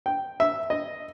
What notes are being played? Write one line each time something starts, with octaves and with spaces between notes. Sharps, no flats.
G5
E5
D#5